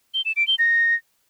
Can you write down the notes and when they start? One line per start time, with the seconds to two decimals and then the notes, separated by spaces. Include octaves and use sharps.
0.14 G7
0.25 E7
0.36 D7
0.48 G7
0.59 A#6